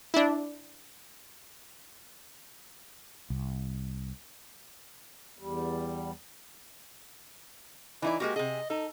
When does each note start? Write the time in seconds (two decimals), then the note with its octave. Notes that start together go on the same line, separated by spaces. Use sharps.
0.14 D4 E4
3.30 C2
5.39 E2 G3
8.02 E3 D#4 E4 D5
8.20 G#3 A#3 F#4 G4
8.36 C3 G#4 D#5
8.70 D#4 A4